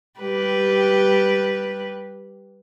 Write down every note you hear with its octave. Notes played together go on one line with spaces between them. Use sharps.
G3 G4 B4